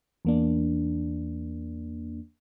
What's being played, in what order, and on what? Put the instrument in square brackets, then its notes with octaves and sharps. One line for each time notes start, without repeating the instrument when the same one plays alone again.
[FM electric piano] E2 A#3 D4